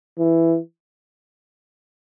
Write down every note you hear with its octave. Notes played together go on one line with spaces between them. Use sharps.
E3